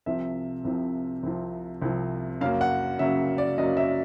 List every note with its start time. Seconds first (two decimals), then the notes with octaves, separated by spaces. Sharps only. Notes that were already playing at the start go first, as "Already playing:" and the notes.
0.06 C2 C3 F3 E5
0.65 C2 C3 F3
1.23 C2 C3 F3
1.82 C2 C3 F3
2.41 F#2 C#3 F#3 A#3 F5
2.61 F#5
2.99 F#2 C#3 F#3 A#3 E5
3.38 D5
3.58 F#2 C#3 F#3 A#3 D#5
3.77 E5